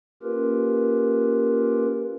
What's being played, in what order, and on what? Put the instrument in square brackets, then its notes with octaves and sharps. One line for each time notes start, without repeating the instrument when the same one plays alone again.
[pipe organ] A#3 C#4 F4 G4 A#4 B4